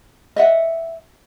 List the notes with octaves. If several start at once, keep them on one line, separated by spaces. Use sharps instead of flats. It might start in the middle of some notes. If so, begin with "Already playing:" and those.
D#5 E5 F#5